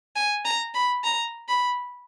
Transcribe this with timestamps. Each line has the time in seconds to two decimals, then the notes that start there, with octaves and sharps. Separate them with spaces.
0.16 G#5
0.46 A#5
0.74 B5
1.04 A#5
1.48 B5